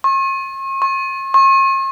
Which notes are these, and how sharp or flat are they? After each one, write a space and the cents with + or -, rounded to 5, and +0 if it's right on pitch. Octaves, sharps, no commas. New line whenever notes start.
C#6 -45
C#6 -45
C#6 -45